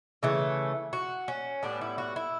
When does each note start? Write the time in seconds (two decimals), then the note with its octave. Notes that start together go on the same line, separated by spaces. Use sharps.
0.23 C#3 E3 A3
0.93 F#4
1.28 C#4
1.63 A2 G3 B3 D4
1.81 E4
1.98 F#4
2.16 E4